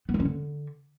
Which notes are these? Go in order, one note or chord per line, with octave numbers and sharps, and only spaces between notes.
B3
G#3
C#4
D3